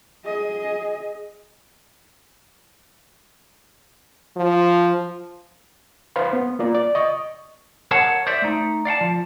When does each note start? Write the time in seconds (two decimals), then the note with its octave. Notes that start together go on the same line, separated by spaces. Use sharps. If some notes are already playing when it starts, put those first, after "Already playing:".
0.25 G#4 D#5
4.37 F3
6.16 B4 C5 F5 C6
6.33 B3
6.59 A#3 F4 D5
6.75 D5
6.95 D#5 C#6
7.91 A#4 C#5 F5 F#5 A5
8.27 C5 D5 E5
8.42 A3 D#4
8.85 D5 F5 F#5 A5
9.01 F3